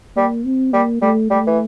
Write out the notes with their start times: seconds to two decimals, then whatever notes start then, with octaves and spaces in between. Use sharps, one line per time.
0.16 G3 A#3
0.45 C4
0.73 G3 A#3
1.02 G3 A3
1.30 G3 A3
1.47 E3